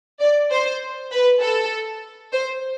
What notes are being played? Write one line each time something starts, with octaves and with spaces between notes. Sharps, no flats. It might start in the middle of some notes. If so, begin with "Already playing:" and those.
D5
C5
B4
A4
C5